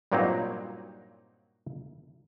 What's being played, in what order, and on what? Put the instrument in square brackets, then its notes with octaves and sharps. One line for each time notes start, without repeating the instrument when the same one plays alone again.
[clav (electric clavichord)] G2 A#2 F#3 A#3 C4 D#4